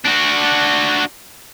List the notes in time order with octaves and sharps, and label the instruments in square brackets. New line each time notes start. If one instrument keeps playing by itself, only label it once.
[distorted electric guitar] D4 F#4